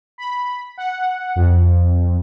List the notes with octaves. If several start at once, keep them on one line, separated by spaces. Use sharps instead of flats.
B5
F#5
F2